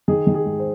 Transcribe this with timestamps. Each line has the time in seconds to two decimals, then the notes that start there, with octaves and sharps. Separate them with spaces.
0.08 D#3 G#4
0.27 D#3
0.34 G#4
0.46 G#2
0.60 C5